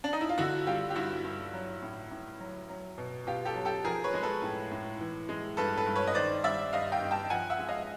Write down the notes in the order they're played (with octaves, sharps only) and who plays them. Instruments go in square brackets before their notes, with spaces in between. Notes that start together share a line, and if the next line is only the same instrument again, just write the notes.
[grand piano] D4
D#4
E4
F4
D3 E4 F#4
G3 F4 G4
G4
G2 E4 F#4
G2
F#3
A2
A2
F#3
F#3
B2
B2 F4 G4
G4 A4
F#3
G4 A4
F3 G#4 A#4
B4 C#5
G#3
A4 B4
A2
A2
E3
G#3
G2 A4 B4
A4 B4
G2
B4 C#5
D#5
D#3 C5 D5
G3 D5 E5
G2 D#5 F5
F5 G5
G2
G5 A5
F3 F#5 G#5
E5 F#5
G#3
D#5 F5